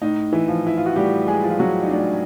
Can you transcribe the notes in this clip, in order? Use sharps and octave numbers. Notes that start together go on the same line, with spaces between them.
A2 D#4
E3 E4
F3
E4
F4
F#4
A2 G3 G4
G#3 G#4
F3
F4
F#3 F#4
D#4
A2 D4